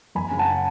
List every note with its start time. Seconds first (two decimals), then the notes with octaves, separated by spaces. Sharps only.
0.15 F#2 G#5 B5
0.31 C#3
0.39 F#5 A5